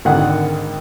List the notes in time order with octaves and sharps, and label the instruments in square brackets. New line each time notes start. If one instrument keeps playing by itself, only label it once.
[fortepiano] G#1 D3 D#3 F#5